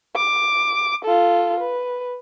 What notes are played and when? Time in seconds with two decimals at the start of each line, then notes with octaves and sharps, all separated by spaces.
0.16 D6
1.04 F4 A4
1.60 B4